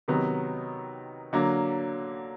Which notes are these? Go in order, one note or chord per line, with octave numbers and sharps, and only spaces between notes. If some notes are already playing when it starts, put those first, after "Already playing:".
C3 D#3 F#3 B3
D3 F#3 A#3